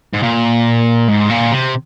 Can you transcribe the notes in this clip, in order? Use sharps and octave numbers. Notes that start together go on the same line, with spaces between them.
G#2
A#2
G#2
A#2
C3